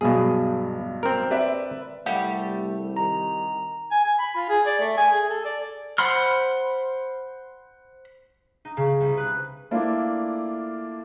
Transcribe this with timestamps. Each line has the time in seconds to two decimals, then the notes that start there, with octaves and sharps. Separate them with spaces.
0.01 B1 G2 B2 G#4
1.03 C4 A#4
1.31 B4 D5 E5
2.06 C2 G3 A3 G4 F#5
2.97 D#3 A#5
3.91 G#5
4.04 G#5
4.19 B5
4.36 F4
4.49 G#4
4.66 D5
4.80 A3
4.97 G#5
5.13 G#4
5.29 A4
5.45 D5
5.98 C5 F#5 B5 C6 F6
8.65 D#4
8.77 C#3
9.00 C2
9.17 B4
9.71 A3 A#3 D4 E4 F4